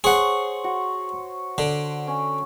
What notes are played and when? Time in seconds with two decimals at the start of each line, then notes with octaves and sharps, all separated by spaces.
0.04 G#4 C5 C#5 F#5
0.64 F#4
1.58 D3
2.07 C#4